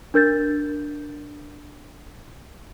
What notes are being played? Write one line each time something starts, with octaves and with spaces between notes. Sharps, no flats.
D4 A#4 G6 A6